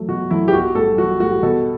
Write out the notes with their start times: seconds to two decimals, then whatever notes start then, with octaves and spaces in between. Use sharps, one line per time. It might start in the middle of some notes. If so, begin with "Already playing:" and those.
Already playing: F#3 A3
0.08 B2 F#4
0.31 F#3 A3 E4
0.48 G4
0.53 B1 F#4
0.75 A2 G3 A4
0.97 B1 F#4
1.20 A2 G3 F#4
1.43 B2 A4